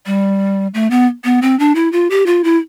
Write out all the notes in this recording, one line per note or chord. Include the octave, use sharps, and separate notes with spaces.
G3
A3
B3
B3
C4
D4
E4
F4
G4
F4
E4